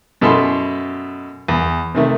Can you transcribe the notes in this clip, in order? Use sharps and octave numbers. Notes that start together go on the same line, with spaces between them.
F#2 B2 E4 A4 B5 C6
E2
C3 D#3 A3